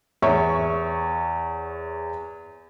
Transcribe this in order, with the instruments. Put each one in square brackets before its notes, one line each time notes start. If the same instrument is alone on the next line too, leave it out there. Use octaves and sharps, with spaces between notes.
[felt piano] E2 C#5 E5 C#6